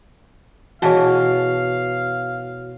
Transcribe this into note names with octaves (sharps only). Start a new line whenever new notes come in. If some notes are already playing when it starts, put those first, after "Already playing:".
B2 E3 F#4 G#4 C#5 F5 G#5 A5